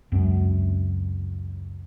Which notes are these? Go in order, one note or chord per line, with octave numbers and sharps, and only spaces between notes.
C#2 F#2 C4